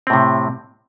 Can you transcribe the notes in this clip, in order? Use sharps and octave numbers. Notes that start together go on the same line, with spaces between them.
A2 C3 C4